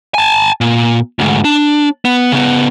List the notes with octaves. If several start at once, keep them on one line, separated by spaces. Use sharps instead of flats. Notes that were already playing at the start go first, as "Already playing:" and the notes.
G#5 A5
A#2
D2 G#2
D4
B3
C#3 B3